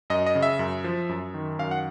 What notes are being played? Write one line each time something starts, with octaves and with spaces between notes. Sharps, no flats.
F#2 D#5
D#5
C#3
E5
F#2
F3
F#2
D#3
F#2 F5
F#5